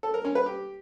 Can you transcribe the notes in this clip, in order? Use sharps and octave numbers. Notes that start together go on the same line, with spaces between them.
A4
A#4
C#4
B4
G4